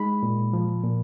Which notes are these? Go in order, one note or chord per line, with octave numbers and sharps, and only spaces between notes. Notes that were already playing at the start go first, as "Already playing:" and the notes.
Already playing: G#3 D#4 B5
A#2
F3
A#2